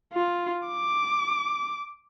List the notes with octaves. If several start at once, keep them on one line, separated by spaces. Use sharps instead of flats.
F4
D6